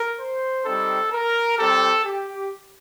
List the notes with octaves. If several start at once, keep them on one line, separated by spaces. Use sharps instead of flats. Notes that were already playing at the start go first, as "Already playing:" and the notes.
Already playing: A#4
C5
G3 C4 D#4 A4
A#4
G3 C4 G4 A4
G4